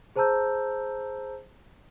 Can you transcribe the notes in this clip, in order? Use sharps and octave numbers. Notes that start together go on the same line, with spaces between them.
G#4 C5 A5 A#5 E6 G6